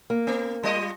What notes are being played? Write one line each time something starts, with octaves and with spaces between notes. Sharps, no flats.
A#3
B3
G3 F4 D#5